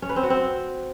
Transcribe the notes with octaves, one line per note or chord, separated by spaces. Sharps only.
C#4
B4
C4
F#4
C4